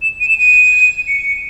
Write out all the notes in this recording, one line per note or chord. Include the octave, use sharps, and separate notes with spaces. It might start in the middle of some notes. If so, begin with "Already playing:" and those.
E7
D#7
E7
D#7
C#7